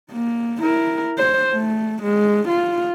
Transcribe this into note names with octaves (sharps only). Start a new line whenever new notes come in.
A#3
E4 A#4
C5
A3
G#3
F4